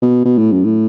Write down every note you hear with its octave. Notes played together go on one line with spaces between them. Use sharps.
B2
B2
A2
F#2
A2